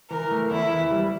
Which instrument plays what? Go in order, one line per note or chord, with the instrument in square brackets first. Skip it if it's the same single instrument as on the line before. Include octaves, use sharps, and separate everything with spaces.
[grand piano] E3 [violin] A#4
[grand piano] A3
[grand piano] E2 [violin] E4
[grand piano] E3
G3